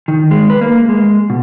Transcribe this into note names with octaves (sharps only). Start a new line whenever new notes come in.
D#3
G#3
B4
A#3
G#3
B2